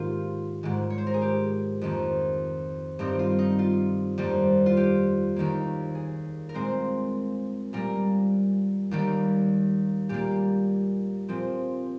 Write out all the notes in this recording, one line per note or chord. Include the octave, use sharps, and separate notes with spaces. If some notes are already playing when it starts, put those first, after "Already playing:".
Already playing: G#2 D#3 A#3 F4 G4 A#4 C5
G#2 D#3 G#3
C#5
C5
A#4
G#4
G4
F2 D#3 A#3
G2 D#3 G3 C4 D#4
F4
D#4
F4
F2 D#3 G3 A#3
F4
G4
D#2 D#3 A#3
G#4
A#4
A#2 G#3 C4 C5
A#2 G3 A#3 A#4
D#2 D#3 G3 A#3
A#2 G3 A#3 G4
A#2 F3 C4